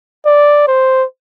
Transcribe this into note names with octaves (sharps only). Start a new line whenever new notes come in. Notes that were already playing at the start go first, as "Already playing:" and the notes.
D5
C5